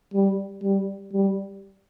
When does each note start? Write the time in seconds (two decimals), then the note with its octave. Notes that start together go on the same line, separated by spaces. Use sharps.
0.14 G3
0.63 G3
1.13 G3